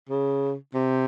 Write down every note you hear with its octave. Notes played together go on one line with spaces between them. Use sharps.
C#3
C3